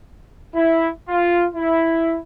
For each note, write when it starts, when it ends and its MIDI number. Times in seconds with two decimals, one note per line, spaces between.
0.55 0.88 64
1.08 1.46 65
1.55 2.17 64